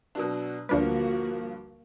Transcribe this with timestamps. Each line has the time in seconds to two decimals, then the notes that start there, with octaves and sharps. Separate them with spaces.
0.15 B2 F#3 D4
0.69 D2 G2 F3 A#3 D4 F#4 B4